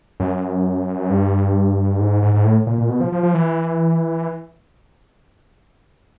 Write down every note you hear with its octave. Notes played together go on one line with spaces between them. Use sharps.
F#2
G2
G#2
G#2
G#2
A2
A#2
A#2
B2
F3
F3
F3
E3